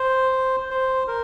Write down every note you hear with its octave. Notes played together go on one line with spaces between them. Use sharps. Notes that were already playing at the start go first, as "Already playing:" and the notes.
Already playing: C5
C5
A#4